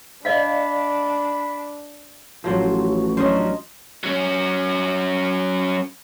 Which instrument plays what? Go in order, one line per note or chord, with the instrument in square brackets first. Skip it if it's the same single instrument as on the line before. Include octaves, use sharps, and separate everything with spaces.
[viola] D4 [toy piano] D5 D#5 F5 [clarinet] B5
[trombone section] A1 [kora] F3 F#3 C5 [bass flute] F#4
[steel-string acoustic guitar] F#3 C#4 D4 [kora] C5 D#5
[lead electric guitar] F#3 C#4